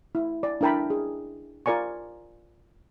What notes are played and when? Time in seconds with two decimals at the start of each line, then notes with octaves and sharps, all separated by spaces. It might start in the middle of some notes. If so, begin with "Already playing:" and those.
0.15 E4
0.43 D5
0.61 D4 E4 A#4 G5 A5 B5
0.90 G#4
1.66 F4 A#4 D5 G#5 C#6